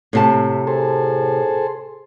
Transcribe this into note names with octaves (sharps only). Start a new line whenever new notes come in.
A2 C3 A5
G#4 A4 C5